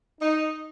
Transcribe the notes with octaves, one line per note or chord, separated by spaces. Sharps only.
D#4